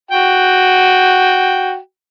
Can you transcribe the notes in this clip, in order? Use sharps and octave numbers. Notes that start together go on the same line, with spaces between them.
F#4 G5